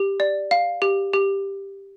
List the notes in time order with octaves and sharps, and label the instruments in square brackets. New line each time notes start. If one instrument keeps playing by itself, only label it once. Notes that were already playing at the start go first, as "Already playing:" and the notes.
Already playing: [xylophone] G4
D5
F5
G4
G4